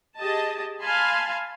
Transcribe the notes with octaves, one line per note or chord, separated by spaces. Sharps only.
G4 G#4 D#5 A5
F5 G#5 A5 B5 C6